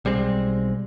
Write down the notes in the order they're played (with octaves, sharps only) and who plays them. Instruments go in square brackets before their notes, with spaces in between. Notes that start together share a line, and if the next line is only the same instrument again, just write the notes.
[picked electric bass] B1 G3 G#3 C4